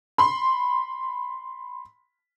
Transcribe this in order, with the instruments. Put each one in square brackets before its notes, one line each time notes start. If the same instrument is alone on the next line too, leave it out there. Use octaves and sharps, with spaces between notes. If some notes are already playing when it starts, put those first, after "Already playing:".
[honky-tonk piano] B5 C6